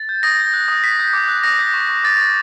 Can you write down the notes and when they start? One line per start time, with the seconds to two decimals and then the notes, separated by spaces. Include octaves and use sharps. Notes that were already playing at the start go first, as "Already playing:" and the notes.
Already playing: A6
0.09 G6
0.23 D#6 A#6
0.39 G6
0.54 F#6
0.68 D#6
0.84 D#6 B6
0.99 G6
1.13 D6
1.29 F#6
1.44 D#6 A#6
1.59 G6
1.74 C#6
1.89 C#6
2.04 D6 A6
2.20 F#6